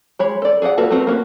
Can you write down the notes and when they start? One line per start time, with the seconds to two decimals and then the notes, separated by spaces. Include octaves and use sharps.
0.19 G#3 C#5 B5
0.42 A4 D5
0.62 G#4 A4 D5 F#5
0.77 A#3 F4 F#4 A4 B4
0.91 A3 B3 C4 F#4 A#4
1.07 A#3 C#4 F#4